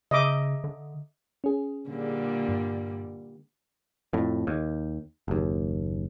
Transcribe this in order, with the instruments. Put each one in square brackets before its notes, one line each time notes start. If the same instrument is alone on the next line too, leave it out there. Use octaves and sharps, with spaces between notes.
[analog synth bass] C#3 [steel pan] D#5 E5 D6
[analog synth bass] D3
[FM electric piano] C#4 G#4
[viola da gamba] A#2 D3 G3
[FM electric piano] G2
[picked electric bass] F2 A2
D#2
F#1 D#2